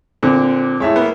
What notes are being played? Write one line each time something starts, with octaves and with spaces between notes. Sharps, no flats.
A#2 D3 C4
A2 G#3 C#5 E5
A#3 B3